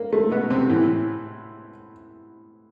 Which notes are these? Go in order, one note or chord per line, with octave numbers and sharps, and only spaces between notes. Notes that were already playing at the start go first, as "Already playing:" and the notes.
Already playing: A#3
A3
B2 B3
C3 C4
A2 E3